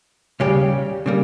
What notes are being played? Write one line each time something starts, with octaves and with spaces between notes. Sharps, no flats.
D#2 C#3 G3 C#4 G4
C#3 G3 A#3